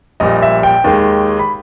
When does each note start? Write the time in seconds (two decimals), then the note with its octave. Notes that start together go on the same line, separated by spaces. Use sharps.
0.20 A#1 A#2 G3 D#5
0.42 E5
0.63 G5
0.84 D#2 D#3 G#3
1.39 B5